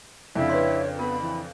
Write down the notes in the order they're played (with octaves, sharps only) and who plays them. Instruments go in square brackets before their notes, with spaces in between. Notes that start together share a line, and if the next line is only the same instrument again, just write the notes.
[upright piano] F2 C#3 D4 [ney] E4
[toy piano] B4 C6 [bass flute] C#5
[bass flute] B3 [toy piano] A#4 [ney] B5
[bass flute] E3